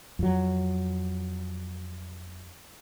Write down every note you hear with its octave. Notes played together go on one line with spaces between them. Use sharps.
F2 F#3